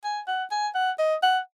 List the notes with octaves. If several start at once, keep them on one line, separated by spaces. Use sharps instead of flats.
G#5
F#5
G#5
F#5
D#5
F#5